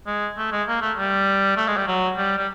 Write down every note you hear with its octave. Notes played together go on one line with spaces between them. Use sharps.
G#3
A3
G#3
A#3
A3
G3
A3
G#3
G3
F#3
G3
G3